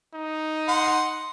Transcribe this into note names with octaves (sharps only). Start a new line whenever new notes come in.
D#4
F#5 C6